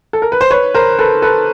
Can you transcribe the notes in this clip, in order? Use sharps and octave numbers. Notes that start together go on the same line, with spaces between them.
A4
A#4
B4
C5
B4 C#5
A#4 C5
A4 B4
A4 B4